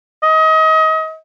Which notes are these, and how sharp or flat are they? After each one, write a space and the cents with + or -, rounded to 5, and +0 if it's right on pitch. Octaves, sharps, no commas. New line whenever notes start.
D#5 +30